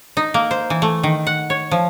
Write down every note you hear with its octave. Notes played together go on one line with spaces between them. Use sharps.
D#4
A#3
C5
E3
A3
D#3
F#5
C#5
F3